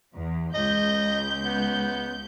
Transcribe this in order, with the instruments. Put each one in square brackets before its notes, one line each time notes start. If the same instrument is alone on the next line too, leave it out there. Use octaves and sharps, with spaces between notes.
[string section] E2
[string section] C#2 G6 [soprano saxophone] D#5
[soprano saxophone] B3